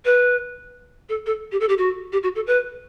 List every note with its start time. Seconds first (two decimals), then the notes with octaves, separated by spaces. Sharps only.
0.05 B4
1.09 A4
1.26 A4
1.52 G4
1.60 A4
1.69 G4
1.78 F#4
2.12 G4
2.23 F#4
2.35 A4
2.47 B4